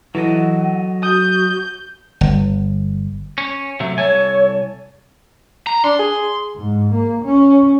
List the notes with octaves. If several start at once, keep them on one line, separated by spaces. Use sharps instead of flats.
E3 F#3 A4 D#5 F#5
F#4 D#6 G6
G1
C#4
C3 F#3 A3 E5
C2 A4 C#5 G#5
A#5
D4 C6
G#4
G#2
A#3
C#4